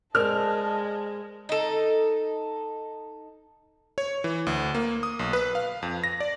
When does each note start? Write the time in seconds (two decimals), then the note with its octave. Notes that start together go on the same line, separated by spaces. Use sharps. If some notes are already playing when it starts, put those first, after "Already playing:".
0.15 G#3 A#4 C5 D5 D#5 A5 F6
1.49 D#4 A4
3.98 C#5
4.24 E3
4.47 D2
4.74 A#3
5.03 D#6
5.19 B1
5.33 B4
5.55 F5
5.82 F2
6.04 A#6
6.20 D5